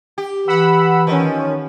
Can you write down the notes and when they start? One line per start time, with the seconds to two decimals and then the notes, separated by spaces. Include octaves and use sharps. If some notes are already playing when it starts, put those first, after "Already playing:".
0.18 G4
0.48 E3 F#5 B5 E6
1.07 D#3 F3 C#4